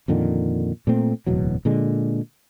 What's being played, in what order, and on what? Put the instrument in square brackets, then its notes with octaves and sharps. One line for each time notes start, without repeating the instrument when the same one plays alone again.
[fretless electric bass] F2 A#2 D3 D#3
A#2 A3 C4
D1 E2 B2 F#3
A#2 D3 G#3